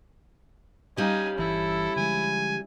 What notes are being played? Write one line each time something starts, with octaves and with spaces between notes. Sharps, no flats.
G3 C#4 D#4 F5 G#5
G1 E3 E4 A4
D3 F3 G#3 G#5